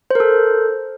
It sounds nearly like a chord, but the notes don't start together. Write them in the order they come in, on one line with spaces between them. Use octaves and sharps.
C5 A#4 A4